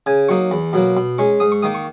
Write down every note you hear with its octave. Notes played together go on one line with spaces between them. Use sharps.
C#3 G#5
F#3 A#3 D#4 C#6
E2 B5
B2 F#3 A#3 B5
B2 B5
G#3 C#4 C#6
G#2 D#6
C#6
D#3 A#3 D#4 D#6
C#6